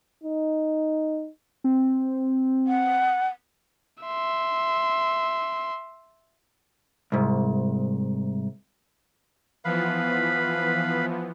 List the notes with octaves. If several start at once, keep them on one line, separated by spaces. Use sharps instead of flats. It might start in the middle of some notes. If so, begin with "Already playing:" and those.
D#4
C4
F#5
E5 C6
C2 G#2
E3 F3 B3 B4 F5 B5